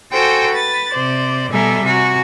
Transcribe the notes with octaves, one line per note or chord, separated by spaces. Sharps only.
F#4 A4 C5 G5 G#5
B4 A6
C3 C5 D5
B2 G3 A4 E5 G#5 A#5
C3 F#4 G#5 A#5